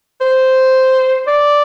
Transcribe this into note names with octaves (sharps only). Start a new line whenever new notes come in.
C5
D5